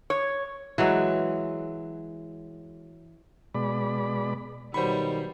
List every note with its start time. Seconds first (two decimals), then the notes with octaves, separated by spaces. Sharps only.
0.10 C#5
0.78 E3 F#3 G#3 F#4
3.55 B2 G#3 D5 B5
4.74 B1 D#3 F#3 G3 C5 B5 C#6